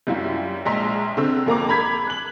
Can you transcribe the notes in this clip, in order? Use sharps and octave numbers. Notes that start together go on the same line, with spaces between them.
F#2 G3 E4 F4
A#1 G#3 E5 A#5 C6
D3 C4 E6
F2 A#3 A#5 D6
A#5 B5 G#6 B6
F#6 F#7